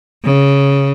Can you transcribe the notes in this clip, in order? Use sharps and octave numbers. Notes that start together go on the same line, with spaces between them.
C#3